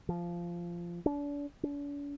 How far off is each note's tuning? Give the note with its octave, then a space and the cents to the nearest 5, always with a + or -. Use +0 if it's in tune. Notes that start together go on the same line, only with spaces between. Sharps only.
F3 -15
D4 -35
D4 -45